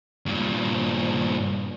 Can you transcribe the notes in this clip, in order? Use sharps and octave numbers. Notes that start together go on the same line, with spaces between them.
G2 A#2